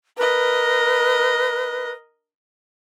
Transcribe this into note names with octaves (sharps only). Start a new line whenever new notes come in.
A#4 B4 D#5